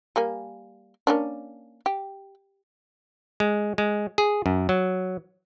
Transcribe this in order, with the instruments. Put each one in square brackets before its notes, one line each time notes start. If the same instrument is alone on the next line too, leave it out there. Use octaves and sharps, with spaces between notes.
[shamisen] G3 A#3 G#5
A#3 C#4 D4
G4
[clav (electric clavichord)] G#3
G#3
G#4
F#2
F#3